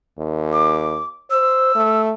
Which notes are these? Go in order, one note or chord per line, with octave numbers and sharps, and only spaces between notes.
D#2
D6
C5 E6
A3